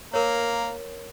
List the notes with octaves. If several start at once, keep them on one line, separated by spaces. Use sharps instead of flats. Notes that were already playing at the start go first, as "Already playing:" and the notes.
A#3 A#4 C#5